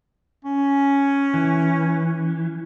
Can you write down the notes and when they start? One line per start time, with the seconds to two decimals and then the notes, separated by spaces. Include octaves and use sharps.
0.45 C#4
1.34 E3